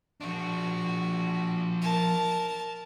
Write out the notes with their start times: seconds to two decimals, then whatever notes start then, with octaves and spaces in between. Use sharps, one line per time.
0.21 F3 D4 F#4
1.82 A#4 A5